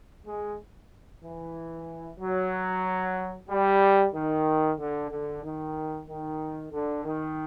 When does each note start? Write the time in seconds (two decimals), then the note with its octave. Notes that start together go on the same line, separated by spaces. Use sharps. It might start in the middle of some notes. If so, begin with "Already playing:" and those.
0.25 G#3
1.23 E3
2.20 F#3
3.49 G3
4.14 D#3
4.78 D3
5.10 D3
5.43 D#3
6.08 D#3
6.72 D3
7.05 D#3